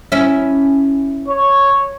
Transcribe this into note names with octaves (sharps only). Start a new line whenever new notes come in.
C#4 E4
C#5